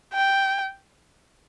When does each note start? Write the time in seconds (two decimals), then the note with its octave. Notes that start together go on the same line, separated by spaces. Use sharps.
0.15 G5